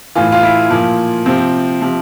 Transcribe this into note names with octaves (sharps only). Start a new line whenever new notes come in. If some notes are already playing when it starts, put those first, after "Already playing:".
A2 E3 F4
F4
E4
A#2 F3
C3 F3 C4
C3 F3